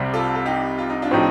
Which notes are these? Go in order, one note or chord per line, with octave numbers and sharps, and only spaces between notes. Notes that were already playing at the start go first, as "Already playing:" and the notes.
Already playing: C2 C3 G3
F4 A4
A4
D#4 G4
F4
D#4
D4 F4
A2 F3 C4 D#4 G4